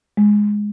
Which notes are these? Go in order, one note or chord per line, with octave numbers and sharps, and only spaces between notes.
G#3